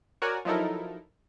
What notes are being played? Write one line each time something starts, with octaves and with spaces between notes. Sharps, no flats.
F#4 A#4 C#5 D5 F#5 G#5
F3 F#3 D#4 E4 A4 A#4